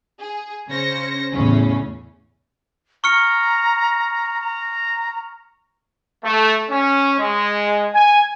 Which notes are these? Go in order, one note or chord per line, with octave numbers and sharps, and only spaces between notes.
G#4
C#3 C#4 C5 A#6 C#7
E2 A2 C#3 C#4
A#5 C#6 F6 C#7
A#5
A3
C#4
G#3
G#5